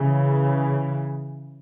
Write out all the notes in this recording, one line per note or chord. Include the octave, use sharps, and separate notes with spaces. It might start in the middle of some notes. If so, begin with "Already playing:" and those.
Already playing: C#3 E3